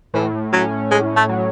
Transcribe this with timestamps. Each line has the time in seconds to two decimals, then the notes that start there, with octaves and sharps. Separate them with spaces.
0.14 A2 E3
0.52 F#3 C#4
0.91 A2 G#3
1.16 A3
1.29 F#3